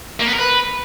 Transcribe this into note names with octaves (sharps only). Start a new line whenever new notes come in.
A#3
B3
A#4
B4